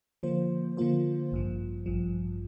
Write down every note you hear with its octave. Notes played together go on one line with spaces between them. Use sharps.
D3 F3 A#3 F4 C5
D3 F3 A#3 F4 C5
A1 G2 F3
A1 G2 F3